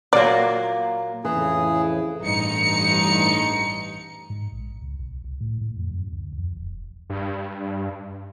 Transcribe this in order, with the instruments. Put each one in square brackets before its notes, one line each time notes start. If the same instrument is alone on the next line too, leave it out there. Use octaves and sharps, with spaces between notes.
[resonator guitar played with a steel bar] A#2 F#3 A#3 [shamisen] D5
[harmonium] F2 A2 C#3 [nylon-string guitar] E3 [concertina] G#4
[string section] A1 G2 D#4 C#7
[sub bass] G#2
A#1
C#2
B1
C2
A2
A2
F2
F#2
D2
F2
E1
[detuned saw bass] G2